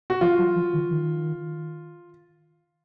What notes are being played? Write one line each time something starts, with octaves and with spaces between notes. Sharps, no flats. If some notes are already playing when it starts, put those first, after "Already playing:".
F#4
F3 F4
F#3
F3
D#3
D#3